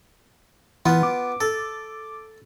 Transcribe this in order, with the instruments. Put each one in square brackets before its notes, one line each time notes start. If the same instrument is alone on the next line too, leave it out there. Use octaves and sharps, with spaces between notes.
[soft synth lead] E3 [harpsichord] B3 F4
[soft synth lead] D6
[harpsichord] A4